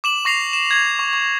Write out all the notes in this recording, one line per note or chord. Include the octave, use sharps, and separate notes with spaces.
D6 E7 F#7
C#6 A#6 C7 F7
E7
G#6 F7
C#6
C#6